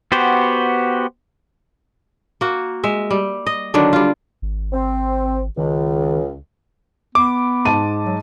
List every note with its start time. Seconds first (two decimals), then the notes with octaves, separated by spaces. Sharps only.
0.12 B3 F#4 G4 C5
2.41 A#3 F#4
2.84 G#3 E5
3.11 G3
3.46 D#5
3.74 D3 D#3 F#3 D4
3.93 G3 F4
4.42 G#1
4.73 C4
5.58 C#2 D#3
7.15 B3 D6
7.65 G#2 A5 D#7
8.06 F#3